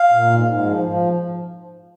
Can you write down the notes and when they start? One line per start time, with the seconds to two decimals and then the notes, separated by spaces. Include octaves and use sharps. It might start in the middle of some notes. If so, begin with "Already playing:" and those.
Already playing: F5
0.13 A#2
0.30 G#2
0.47 G#2
0.65 F3
0.83 F3